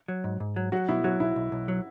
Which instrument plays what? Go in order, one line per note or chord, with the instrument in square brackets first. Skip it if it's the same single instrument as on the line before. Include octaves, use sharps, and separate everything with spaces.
[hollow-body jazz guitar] F#3
G#2
G#2
F#3
[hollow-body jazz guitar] F#3 [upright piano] F#4
[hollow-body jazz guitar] B2 [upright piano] E4
[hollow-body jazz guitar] F#3 [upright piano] F#4
[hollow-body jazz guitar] B1 [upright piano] E4
[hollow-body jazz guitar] B1
B1
F#3